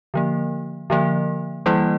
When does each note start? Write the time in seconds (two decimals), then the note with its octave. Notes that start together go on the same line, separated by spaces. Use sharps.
0.14 D3 F3 A#3
0.90 D3 F3 A#3
1.66 E3 G3 A#3 E4